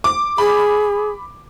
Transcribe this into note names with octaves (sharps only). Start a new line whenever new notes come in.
D6
G#4 B5